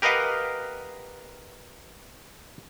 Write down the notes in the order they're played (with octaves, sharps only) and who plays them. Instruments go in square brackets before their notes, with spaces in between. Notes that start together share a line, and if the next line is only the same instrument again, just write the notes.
[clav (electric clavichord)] G4 A#4 B4 D#5 F5 F#5